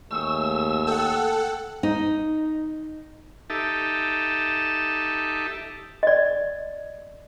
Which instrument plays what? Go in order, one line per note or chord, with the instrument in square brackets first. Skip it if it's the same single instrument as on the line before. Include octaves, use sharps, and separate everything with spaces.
[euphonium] D#2 [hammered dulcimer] A3 G#4 C#6 [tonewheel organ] E6
[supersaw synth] A4 F#5 [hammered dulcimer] G5
[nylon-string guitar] D#4
[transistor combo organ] D#4 G4 A4 E5 A5
[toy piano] D5 D#5